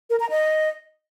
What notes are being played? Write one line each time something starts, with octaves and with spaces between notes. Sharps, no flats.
A#4
A#5
D#5